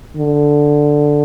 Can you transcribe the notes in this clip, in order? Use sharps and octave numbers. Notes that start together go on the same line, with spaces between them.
D3